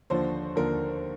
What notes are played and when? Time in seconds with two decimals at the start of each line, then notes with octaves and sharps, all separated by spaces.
0.10 D#2 D3 F3 C5
0.56 D#2 D3 F3 A#4